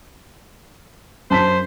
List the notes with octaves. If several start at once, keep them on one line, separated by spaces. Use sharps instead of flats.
F#2 C5 A5 B6